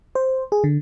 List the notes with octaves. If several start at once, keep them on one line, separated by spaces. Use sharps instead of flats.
C5
G#4
D3